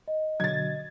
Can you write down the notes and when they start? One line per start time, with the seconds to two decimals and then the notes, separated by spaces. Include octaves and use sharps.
0.08 D#5
0.40 B2 D3 F#3 G#6 A6